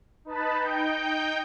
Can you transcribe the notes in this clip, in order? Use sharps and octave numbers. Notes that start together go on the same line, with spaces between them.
D#4 B4 A5 B5
D#4 G5 G6